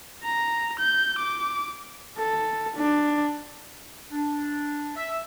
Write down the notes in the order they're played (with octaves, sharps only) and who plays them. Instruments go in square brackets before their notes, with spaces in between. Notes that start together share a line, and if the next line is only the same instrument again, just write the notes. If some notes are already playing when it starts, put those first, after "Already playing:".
[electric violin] A#5
G6
D6
[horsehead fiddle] A4
D4
[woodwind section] D4
E5